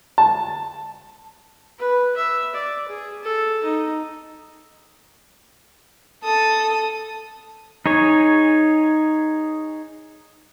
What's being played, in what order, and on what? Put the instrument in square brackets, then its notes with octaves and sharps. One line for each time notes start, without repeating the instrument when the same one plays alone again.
[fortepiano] A5
[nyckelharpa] B4
E5
D5
G#4
A4
D#4
[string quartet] A4 D#6
[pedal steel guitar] D#4 G#4 C#5